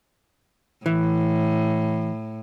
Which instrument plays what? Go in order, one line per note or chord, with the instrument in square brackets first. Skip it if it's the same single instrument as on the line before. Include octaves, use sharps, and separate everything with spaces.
[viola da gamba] A2 [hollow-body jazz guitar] E3